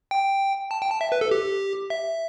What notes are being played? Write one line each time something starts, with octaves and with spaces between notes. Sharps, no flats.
G5
A5
G5
A5
E5
B4
A4
G4
E5